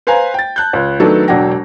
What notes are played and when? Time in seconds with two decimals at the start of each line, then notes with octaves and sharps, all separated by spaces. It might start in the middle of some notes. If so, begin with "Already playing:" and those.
0.07 B4 C5 F5 G#5 A#5
0.34 G5 A6
0.56 A5 F#6 G6
0.73 C#2
1.00 D#3 F#3 A3 B3 D4 A4
1.28 E1 F#3 D4 F#5 G5 A#6